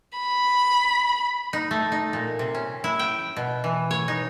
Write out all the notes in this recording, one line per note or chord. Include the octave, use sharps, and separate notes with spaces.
B5
D#4
A3
D#4
A#2
C3
C#4
E4
G5
B2
E3
C#5
D#4